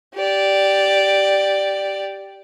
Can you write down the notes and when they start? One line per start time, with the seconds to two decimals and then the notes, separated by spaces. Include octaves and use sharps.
0.16 G4 D5